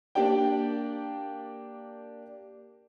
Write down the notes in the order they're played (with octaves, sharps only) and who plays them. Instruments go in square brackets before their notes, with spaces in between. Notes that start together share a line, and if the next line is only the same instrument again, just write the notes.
[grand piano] A#3 D4 G4 D5 G5